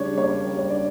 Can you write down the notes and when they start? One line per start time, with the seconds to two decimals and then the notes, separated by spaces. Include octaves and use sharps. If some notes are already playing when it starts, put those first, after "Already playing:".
Already playing: C#3 G3 D4 C#5
0.17 A#3 C#5
0.45 G3
0.59 C#5
0.70 D4 D5